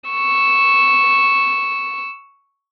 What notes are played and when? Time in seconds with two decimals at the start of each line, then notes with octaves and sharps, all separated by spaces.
0.10 C#6 E6